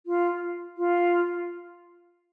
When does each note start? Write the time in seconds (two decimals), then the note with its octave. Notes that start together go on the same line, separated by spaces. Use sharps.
0.06 F4
0.78 F4